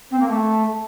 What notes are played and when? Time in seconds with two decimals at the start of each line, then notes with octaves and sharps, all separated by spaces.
0.11 C4
0.19 A#3
0.28 A3